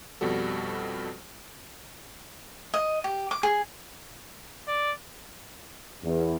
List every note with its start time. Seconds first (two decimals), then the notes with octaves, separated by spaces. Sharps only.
0.21 F2 B2 G3 F#4 A4
2.74 D#5
3.04 G4
3.31 D6
3.43 G#4
4.68 D5
6.04 E2